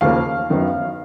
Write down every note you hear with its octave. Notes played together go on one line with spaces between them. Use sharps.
D#2 C#3 F3 A#3 F5
F#2 D#3 F#3 B3